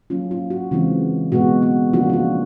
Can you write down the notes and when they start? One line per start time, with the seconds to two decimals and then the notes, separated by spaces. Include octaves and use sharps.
0.10 F#3 A#3 C#4 F4
0.31 F4
0.50 F#4
0.71 C#3 E3 G#3 C4 F4
1.32 B2 G#3 B3 F#4
1.63 F#4
1.93 C#3 F3 A#3 D4 F4 F#4
2.09 F#4
2.13 F4